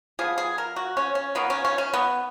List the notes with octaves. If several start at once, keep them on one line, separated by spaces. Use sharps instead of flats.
F3 B3 G#4
G#4
A#4
F#4
C#4
C#4
D#3 A#3 B3
C#4
C#4
C#4
B3